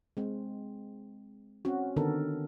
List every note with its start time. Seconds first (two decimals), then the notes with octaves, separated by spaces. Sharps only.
0.17 G#3 C4
1.65 C4 C#4 F#4
1.96 D3 D#3 B3 A4 A#4